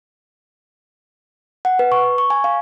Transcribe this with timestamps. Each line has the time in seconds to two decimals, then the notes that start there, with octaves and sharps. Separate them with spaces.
1.65 F#5
1.79 B4
1.92 C#6
2.18 C#6
2.30 G#5
2.44 F5